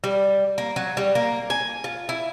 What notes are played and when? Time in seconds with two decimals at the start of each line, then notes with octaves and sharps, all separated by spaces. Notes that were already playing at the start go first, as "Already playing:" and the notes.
0.04 G3
0.58 A#3
0.76 F#3
0.97 G3
1.15 A#3
1.50 G#5
1.84 F4
2.09 E4